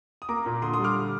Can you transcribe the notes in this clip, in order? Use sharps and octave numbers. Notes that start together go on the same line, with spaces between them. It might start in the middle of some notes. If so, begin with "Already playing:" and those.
D#6
A#3 A#5 D6
A#2
D3 C6 D#6
C6 D#6
G3
D6 F6